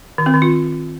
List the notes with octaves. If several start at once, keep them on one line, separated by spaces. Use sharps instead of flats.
D#3
C4
D#3
F4